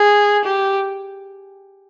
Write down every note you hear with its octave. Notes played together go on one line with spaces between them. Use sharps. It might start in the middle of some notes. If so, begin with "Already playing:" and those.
Already playing: G#4
G4